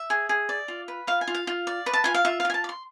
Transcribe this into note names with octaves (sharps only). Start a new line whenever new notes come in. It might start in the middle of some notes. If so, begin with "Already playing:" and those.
Already playing: E5
G#4
G#4
D5
F4
B4
F4 F5
G#5
F4
F5
F4
D5
B4
A5
F4 G#5
F5
F4 E5
F5
F4 G#5
A5
D5
C6